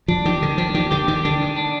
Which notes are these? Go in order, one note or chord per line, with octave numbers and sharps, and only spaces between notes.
F3 D4
D#3 G4
D3 D#3
F3 D4
D#3 G4
D3 G4
D#3 G4
D3 D4
D#3
D4